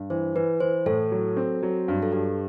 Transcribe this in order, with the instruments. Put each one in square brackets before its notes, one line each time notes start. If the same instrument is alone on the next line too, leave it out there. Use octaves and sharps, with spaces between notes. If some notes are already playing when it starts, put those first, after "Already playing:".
Already playing: [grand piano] G2
[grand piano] E3 [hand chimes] C5
[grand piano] E3 [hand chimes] B4
[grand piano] E3 [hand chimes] C5
[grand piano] A2 [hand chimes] A4
[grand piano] F#3
C4
F#3
G2
[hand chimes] A4
[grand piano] G2 [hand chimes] G4